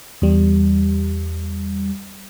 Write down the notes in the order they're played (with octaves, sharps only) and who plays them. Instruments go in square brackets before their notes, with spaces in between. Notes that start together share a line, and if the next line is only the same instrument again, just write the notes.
[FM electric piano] E2 G3